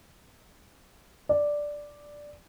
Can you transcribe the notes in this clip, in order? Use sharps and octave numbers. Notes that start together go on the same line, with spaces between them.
D5